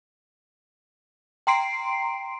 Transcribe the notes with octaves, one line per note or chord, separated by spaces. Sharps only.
G5 A#5 C6 C7 D7